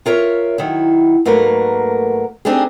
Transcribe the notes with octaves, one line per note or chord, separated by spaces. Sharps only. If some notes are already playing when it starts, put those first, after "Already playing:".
F4 A#4 C#5 E5
D#3 F#3 E4
G#2 F#3 A3 A#3 A#4 B4
C4 D4 D#4 G4 G#4